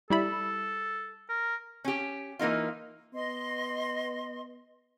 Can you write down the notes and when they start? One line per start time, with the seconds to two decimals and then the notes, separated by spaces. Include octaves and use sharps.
0.10 G3 E4 A4 B5
1.29 A#4
1.85 C#4 G4
2.39 E3 A#3 D#4 F4
3.13 B3 D#5 C6